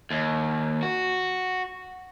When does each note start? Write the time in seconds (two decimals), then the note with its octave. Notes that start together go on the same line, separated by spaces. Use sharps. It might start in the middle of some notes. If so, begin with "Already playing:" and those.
0.10 D#2
0.83 F#4